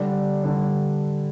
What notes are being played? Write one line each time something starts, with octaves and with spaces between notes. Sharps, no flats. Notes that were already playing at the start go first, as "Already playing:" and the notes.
Already playing: D3 G3 D4
D3 G3 D4